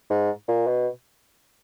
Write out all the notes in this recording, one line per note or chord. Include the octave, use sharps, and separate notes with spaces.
G#2
A#2
B2